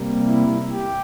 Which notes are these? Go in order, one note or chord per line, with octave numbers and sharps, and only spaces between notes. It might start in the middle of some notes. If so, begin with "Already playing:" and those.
Already playing: C3 G3 A#3
E4
G4